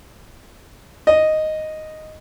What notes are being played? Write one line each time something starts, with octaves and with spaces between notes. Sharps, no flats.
D#5